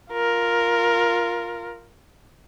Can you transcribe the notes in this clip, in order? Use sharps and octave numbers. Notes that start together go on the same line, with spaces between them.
F4 A#4